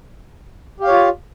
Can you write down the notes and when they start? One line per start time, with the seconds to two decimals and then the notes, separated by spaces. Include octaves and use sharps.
0.80 G4
0.84 F5
0.87 C#5
0.91 F4